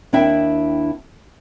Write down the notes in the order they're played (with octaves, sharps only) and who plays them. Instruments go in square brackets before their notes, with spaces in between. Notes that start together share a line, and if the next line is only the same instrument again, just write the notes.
[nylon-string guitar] D#2 D4 E4 E5 G5